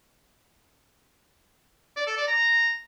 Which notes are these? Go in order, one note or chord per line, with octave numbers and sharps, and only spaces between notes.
D5
A4
D5
A#5